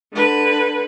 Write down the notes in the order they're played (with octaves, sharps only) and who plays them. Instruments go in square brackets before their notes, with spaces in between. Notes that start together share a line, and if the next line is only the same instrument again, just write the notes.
[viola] D3 B4